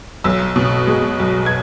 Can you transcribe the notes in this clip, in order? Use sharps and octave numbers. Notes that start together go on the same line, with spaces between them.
B1 E6
B2
G#3
B1
G#6